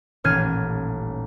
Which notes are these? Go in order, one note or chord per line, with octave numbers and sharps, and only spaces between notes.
D#1 A1 F6 G#6 D#7